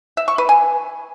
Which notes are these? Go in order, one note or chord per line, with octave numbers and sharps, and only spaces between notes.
E5
C#6
B4
G#5